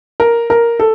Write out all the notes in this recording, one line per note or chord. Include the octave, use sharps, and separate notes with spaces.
A#4
A#4
A4